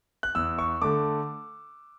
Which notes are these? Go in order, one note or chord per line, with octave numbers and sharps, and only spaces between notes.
F#6
E2 E6
C#6
D3 A3 D6